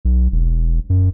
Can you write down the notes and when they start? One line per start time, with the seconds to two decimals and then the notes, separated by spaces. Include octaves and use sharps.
0.05 B1
0.32 E1
0.90 F#2